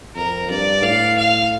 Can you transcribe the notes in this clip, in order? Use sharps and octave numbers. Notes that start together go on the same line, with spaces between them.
F2 A#4
G2 D5
A2 F5
F5